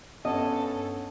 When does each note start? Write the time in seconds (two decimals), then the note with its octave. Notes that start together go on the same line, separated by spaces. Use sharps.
0.25 G2 B3 C#4 A4 C#5 D#5